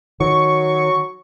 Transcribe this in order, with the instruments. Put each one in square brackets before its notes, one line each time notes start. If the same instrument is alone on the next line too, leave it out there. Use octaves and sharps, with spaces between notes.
[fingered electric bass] D#3 [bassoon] F#3 [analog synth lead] C#6